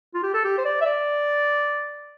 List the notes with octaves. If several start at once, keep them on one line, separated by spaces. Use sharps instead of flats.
F4
G4
A4
G4
C5
D5
E5
D5